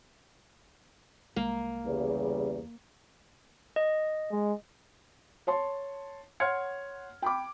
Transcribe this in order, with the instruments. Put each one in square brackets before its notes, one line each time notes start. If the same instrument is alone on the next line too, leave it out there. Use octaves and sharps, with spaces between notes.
[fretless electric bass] C2 G#3 [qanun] A#3
[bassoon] E2 [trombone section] C#3 G3
[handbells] D#5
[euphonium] G#3
[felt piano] C#5 A5 C6
C#5 F#5 C6 F6 G#6 C#7
G5 B5 D6